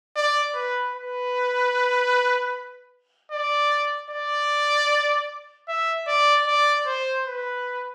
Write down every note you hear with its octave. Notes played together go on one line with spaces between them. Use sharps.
D5
B4
B4
D5
D5
E5
D5
D5
C5
B4